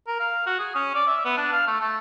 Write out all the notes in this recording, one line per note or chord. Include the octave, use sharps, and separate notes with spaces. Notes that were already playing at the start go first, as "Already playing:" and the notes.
A#4
F5
F#4
G#4
C#4
D5
E5
B3
D4
F5
A3
A3